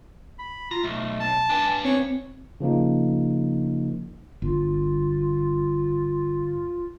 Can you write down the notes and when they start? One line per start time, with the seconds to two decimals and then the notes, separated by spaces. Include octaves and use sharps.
0.39 B5
0.71 F4 A#5
0.83 B1 A3
1.20 A5
1.50 D4 B4 G#5
1.85 C4 C#5
2.60 C#3 F3 A#3 D#4
4.42 G1 F4